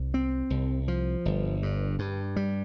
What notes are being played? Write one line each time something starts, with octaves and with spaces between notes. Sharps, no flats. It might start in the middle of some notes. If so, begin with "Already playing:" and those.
Already playing: C2
C4
C2
F3
G1
G2
G2
G3